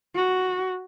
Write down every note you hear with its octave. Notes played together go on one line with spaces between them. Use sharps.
F#4